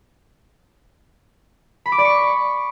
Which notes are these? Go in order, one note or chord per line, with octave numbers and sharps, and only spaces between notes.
B5
D6
D5
C#6